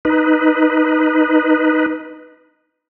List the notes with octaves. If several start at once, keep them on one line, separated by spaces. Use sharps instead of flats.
D#4 B4